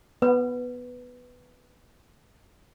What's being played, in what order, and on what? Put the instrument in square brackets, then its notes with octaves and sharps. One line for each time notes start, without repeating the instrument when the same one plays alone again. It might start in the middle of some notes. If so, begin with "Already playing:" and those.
[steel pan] B3 [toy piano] B4